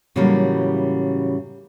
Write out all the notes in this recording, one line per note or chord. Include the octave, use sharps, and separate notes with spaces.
A2 C#3 E3 F#3 G3 A#3